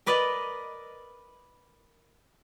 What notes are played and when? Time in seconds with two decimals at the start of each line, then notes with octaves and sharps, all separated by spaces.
0.06 A#4 B4 D5 D#5